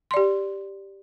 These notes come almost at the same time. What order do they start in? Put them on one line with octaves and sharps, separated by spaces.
C6 D5 G4